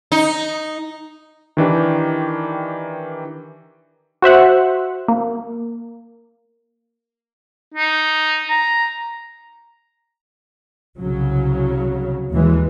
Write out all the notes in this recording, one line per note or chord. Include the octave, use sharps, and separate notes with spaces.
D#4
D#3 E3 D4 G4
F#4 C5 E5 F#5
A#3
D#4
A#5
C2 C#3 F#3
D#2 E3 G#3